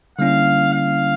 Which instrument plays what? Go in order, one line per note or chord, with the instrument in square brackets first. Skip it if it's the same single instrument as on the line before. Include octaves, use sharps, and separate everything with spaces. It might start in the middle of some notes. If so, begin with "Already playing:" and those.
[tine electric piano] D3 G3 A#3 C#4 E4 [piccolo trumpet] F5
[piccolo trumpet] F5